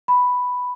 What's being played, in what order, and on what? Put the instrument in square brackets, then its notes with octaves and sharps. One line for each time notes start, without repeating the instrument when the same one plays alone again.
[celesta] B5